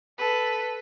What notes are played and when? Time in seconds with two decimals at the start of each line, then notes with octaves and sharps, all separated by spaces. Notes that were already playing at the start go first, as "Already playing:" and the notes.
0.18 A4 B4